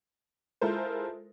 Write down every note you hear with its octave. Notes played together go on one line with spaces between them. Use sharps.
G#3 E4 F4 A4 A#4 C5